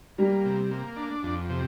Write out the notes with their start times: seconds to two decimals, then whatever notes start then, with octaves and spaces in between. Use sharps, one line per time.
0.18 G3 A#3
0.45 C3
0.71 A#3
0.96 D4
1.23 F2
1.50 C3